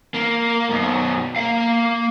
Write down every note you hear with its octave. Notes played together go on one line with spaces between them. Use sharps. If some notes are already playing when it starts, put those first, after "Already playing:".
A#3
F#2 B2
A#3 F5